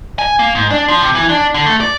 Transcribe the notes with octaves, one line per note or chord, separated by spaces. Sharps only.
G#5
A#3
G#2
D4
F3
C3
E3
D4
D3
A3
D5